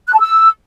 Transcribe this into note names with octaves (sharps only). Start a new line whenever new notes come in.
F#6
A5
E6